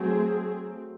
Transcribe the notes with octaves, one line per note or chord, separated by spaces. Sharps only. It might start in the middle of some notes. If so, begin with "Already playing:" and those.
Already playing: F#3 A3 C4 G#4